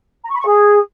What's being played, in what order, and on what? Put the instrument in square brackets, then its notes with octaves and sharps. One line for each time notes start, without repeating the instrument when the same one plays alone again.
[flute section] A#5
C#6
B5
C#6
G#4